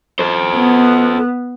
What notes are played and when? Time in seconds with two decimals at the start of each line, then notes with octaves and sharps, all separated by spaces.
0.19 A4 C5
0.57 B3